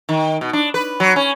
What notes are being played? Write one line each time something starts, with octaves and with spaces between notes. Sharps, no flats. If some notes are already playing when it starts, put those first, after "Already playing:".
D#3
B2
D4
B4
F#3
C#4